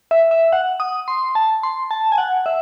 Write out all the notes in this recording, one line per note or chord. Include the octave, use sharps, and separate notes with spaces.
E5
E5
F#5
D#6
C6
A5
C6
A5
G#5
F#5
E5